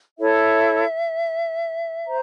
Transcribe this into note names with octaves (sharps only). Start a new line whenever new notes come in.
E4 A4 C#5 E5
C5 A#5